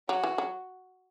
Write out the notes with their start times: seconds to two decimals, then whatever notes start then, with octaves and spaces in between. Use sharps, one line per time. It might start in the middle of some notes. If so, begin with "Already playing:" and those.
0.09 F#3 F#4
0.24 E3
0.38 F#3